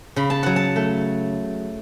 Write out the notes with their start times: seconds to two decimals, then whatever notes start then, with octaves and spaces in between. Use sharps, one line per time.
0.16 C#3 B5
0.30 A5
0.43 F#3 F#5
0.56 A5
0.76 A3